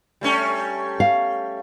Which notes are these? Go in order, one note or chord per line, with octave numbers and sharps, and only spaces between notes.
G3 A3 C#4
F5